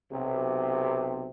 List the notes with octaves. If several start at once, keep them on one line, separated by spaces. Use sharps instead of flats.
B1 C3